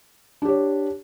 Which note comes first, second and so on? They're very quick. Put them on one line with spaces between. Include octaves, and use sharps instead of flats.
D4 G4 C#5